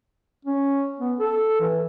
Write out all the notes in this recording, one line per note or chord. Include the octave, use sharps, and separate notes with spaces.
C#4
B3
A4
E3